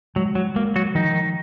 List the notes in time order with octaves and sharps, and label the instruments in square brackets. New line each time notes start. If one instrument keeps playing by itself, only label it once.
[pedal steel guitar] F#3 [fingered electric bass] G#3
[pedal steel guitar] F#3
[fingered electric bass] G#3 [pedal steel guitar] A#3
[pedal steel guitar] F#3 F#4
[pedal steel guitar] D#3 D#4 [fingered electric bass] F3